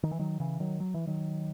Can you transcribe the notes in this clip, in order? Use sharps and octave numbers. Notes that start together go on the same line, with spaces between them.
D#3
E3
D#3 F#3
C#3 E3
D#3 F#3
F#3
E3
D#3 F#3